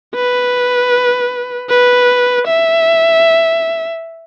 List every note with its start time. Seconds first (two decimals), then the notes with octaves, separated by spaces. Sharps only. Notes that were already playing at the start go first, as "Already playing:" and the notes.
0.15 B4
1.69 B4
2.47 E5